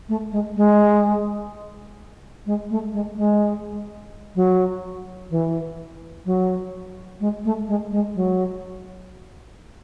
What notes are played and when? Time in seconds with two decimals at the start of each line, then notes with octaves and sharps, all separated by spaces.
0.09 A3
0.32 G#3
0.56 G#3
2.46 G#3
2.70 A3
2.93 G#3
3.17 G#3
4.36 F#3
5.30 E3
6.25 F#3
7.20 G#3
7.44 A3
7.68 G#3
7.91 G#3
8.15 F#3